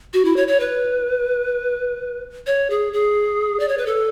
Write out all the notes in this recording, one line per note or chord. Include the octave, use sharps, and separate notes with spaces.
F#4
E4
C#5
C#5
B4
C#5
G#4
G#4
D5
C#5
B4
A4